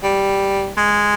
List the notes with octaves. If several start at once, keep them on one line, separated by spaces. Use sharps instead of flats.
G3
G#3